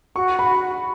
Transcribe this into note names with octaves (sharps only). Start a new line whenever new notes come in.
F#4 C#6
B5